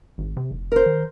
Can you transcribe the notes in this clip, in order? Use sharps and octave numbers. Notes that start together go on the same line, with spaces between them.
G#1
C3
F1
A#4 C5
D#3